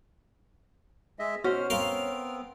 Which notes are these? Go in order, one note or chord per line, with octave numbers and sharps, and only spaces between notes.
G#3 D#5 E5
B2 C#4 F#4 C5 F6
B3 C4 A#4 F5 C6